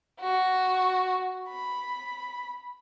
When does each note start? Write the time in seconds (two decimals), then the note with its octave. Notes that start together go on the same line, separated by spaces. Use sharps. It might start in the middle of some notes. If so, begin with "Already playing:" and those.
0.20 F#4
1.49 B5